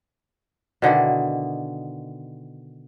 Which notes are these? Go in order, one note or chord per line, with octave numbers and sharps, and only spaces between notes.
B2 D3 D#3 E4